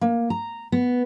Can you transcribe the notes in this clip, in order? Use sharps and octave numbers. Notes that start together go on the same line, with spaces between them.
A#3
A#5
B3